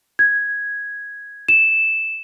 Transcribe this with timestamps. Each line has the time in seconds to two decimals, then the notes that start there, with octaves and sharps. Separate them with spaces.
0.19 G#6
1.49 E7